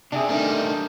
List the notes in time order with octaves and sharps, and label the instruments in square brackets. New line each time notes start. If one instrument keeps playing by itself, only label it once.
[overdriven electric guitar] C3 [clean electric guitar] D4 G#4 [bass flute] E5
[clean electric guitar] D#3 A3 [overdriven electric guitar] G3 D#4 [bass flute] D4